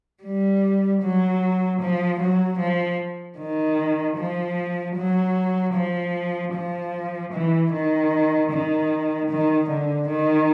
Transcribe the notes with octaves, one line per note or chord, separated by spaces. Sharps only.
G3
F#3
F3
F#3
F3
D#3
F3
F#3
F3
F3
E3
D#3
D#3
D#3
D3
D#3